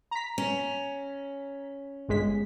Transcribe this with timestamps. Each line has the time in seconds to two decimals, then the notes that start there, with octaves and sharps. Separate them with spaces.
0.11 A#5 B6
0.38 C#4
2.09 G1 G#3 B6